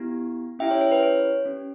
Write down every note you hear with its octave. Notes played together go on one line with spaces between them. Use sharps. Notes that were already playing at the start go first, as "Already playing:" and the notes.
Already playing: B3 E4 G4
C#4 E4 G4 E5 G5
C#5 E5
C#5
B4
C#5
C#4 G4